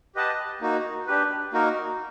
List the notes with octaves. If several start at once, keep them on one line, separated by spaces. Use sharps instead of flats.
G4 B4 D#5 F#5 A5
A#3 D#4 F#4
D4 G4 B4
A#3 D#4 F#4 A#4